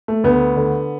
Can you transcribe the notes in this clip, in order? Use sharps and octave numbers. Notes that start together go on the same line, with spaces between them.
A3
D2 B3
D3